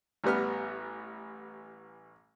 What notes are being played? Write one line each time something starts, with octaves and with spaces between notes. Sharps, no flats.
A1 G3 B3 F6